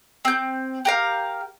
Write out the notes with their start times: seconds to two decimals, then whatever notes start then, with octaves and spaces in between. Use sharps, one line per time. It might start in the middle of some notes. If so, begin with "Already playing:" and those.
0.25 C4 G6
0.85 G4 A#4 F5